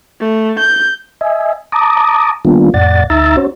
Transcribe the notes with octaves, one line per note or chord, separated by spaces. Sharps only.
A3
G6
D#5 E5 G#5
A5 A#5 D6 D#6
D#3 G3 A#3 B3 D4 F4
F2 A2 D5 F#5 A6
D2 D#4 E5 A#5 E6 A6
C#4 F#4 C5 C#5